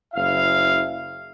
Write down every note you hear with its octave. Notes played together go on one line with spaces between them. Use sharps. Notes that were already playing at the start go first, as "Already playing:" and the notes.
F#1 E4 F5